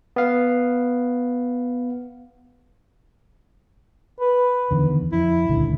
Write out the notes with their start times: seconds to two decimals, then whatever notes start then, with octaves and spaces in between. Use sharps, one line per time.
0.16 B3 F5
4.20 B4
4.71 E2 D3 D#3
5.12 F2 E4
5.49 D#1 C#2 D3